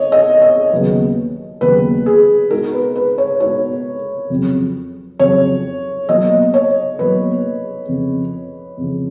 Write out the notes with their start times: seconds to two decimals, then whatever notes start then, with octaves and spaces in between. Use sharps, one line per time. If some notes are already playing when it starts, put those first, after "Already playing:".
Already playing: C#5 D#5
0.12 D#5
0.42 D#5
0.72 D#2 C#3 F#3 B3
1.61 D#2 C#3 F#3 B3 B4
2.06 G#4
2.50 B2 G#3 D#4 F#4 A#4
2.73 B4
2.96 B4
3.18 C#5
3.40 B2 G#3 D#4 F#4 C#5
4.30 F2 C#3 F#3
5.19 F2 C#3 F#3 C#5
6.09 B2 F#3 A#3 D#5
6.54 C#5
6.99 B2 F#3 A#3 B4
7.88 F2 C#3 F3
8.77 F2 C#3 F3